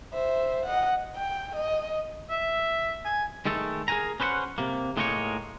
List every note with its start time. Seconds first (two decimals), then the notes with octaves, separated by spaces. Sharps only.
0.12 C5 E5
0.66 D#5 F#5
1.16 G5
1.56 D#5
2.30 E5
3.05 G#5
3.46 D#3 G#3 A3 A4
3.88 G#4 A#4 B4 G#5 A#5
4.20 C#4 B4 C5 D#5 F#5
4.58 C3 A#3
4.97 A2 G#3 A#3 D#4 A#4 C#5